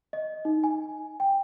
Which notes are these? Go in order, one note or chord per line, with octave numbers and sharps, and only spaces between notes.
D#5
D#4
G#5
G5